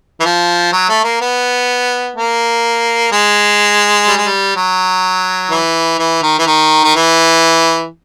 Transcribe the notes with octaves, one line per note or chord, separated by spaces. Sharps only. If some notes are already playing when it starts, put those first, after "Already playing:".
E3
F3
F#3
A3
A#3
B3
A#3
G#3
G3
G#3
G3
F#3
E3
E3
D#3
E3
D#3
D#3
E3